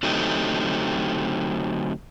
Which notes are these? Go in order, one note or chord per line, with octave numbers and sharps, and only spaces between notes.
D3 F#3 A3 C4 D#4 G4